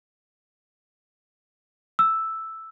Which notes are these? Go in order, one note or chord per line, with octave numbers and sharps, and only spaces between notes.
E6